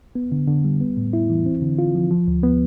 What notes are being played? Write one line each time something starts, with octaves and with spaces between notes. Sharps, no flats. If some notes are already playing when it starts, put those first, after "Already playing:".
B3
D3
D3
G3
B3
A2
E4
E3
C4
D3
F4
F3
F3
D2
B3